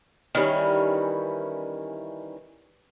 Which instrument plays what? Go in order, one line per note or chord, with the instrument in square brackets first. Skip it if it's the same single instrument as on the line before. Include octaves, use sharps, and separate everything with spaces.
[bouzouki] D#3 E3 G3 C#4